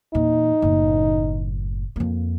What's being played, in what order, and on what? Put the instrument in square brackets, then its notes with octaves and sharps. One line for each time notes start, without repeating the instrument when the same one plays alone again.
[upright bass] E2 A#2 [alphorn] D#4
[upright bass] F#1 A2
F2 A#3